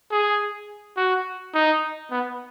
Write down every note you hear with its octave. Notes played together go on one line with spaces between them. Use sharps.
G#4
F#4
D#4
B3